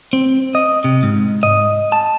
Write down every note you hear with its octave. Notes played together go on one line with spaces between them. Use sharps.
C4
D#5
C3
G#2
D#5
A5